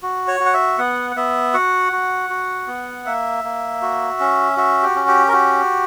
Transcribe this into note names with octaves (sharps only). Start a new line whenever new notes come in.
F#4
C#5
F#4
F#5
E5
B3 F#5
F#5
B3 E5
F#4 F#5
F#4
F#4
B3
A#3 E5
A#3
F#4
C#4
F#4 E5
G4
C#4
G4
A#4
F#4 G4